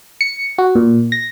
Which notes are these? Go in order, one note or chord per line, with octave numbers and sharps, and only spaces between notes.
C#7
F#4
A#2
A#6